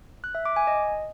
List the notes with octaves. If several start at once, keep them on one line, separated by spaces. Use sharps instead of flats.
F#6
E5
D6
G#5
D#5